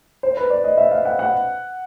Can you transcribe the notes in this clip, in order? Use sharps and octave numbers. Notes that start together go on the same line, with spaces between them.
C5
B4
D5
D#5
E5
F5
F#5
F#5